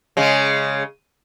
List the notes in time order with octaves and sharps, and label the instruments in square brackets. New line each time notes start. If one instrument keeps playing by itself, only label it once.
[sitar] C#3 G#3